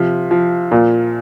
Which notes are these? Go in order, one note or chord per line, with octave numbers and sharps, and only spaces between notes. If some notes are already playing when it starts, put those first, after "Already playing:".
Already playing: C3 F3
F3
A#2